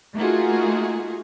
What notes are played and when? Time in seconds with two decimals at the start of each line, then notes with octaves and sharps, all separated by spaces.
0.15 A3 A#3 D#4 F4 F#4 G#4